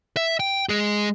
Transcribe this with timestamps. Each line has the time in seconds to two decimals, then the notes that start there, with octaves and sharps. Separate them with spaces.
0.17 E5
0.40 G5
0.69 G#3 G#4